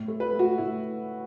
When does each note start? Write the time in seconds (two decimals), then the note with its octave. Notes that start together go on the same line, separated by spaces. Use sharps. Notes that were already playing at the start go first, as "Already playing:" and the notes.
Already playing: A2
0.08 A3
0.20 B4
0.33 A3
0.39 F#4
0.58 A2 E4